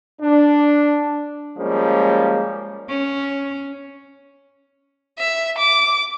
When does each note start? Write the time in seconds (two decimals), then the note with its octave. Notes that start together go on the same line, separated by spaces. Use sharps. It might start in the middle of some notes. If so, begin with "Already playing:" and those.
0.21 D4
1.58 F3 G3 G#3 A#3 C#4
2.89 C#4
5.19 E5
5.58 D6